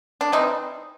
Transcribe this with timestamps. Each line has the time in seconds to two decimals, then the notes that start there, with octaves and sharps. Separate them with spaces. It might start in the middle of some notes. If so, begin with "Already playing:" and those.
0.21 D4
0.32 C3 E3 G3 C4 D#4